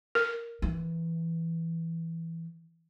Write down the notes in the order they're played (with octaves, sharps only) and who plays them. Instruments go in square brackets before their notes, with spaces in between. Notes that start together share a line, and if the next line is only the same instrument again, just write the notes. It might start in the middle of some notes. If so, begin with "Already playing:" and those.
[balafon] A#4
[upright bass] E3